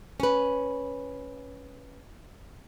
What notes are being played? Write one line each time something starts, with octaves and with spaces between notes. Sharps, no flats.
C#4 B4